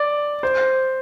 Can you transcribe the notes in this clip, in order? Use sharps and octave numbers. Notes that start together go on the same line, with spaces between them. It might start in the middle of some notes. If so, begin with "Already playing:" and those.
Already playing: D5
C5